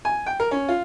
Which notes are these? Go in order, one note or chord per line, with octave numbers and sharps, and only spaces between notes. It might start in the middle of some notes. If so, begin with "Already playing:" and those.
G#5
G5
A#4
C#4
F4